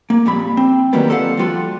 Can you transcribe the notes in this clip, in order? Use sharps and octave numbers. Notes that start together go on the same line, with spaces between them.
A#3
F2 A#2 G3 B5
C4
D#3 E3 F#3 G3 A#3 B3
A#3 F4 A4 B4 F5 F#5
F3 G3 F4 F#4 A4